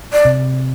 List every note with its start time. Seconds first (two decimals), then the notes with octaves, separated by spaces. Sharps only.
0.13 D5
0.25 C3